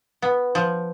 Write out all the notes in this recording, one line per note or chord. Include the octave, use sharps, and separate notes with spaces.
B3
F3